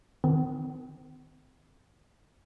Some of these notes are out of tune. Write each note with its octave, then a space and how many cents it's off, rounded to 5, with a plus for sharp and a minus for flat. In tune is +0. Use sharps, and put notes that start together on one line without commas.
D#3 -10 C4 -40